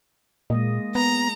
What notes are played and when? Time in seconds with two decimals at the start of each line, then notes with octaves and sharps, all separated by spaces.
0.50 A#2 G#3 A#3 D#5
0.95 B3 A#5